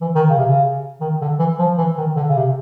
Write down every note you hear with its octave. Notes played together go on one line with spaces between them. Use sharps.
E3
D#3
C#3
C3
C#3
D#3
D3
E3
F3
E3
D#3
D3
C#3
C3